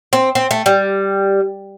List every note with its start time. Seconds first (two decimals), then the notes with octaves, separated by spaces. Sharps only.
0.13 C4
0.35 C4
0.51 A3
0.66 G3